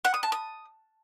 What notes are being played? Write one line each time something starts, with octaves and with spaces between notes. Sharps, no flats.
F#5
D#6
A5
D#6